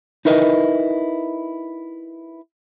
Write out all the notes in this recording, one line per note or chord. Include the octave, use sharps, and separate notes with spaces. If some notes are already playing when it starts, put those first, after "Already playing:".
D#4 E4 A#4 B4 D#5